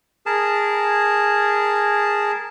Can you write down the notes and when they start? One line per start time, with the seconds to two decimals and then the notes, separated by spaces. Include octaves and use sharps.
0.26 G#4 A#4 A5